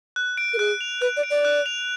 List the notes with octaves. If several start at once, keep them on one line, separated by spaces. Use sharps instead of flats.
F#6
D7
A#4
G#4 F#6
F7
B4 F#6
D5
D7
D5
F#6
F7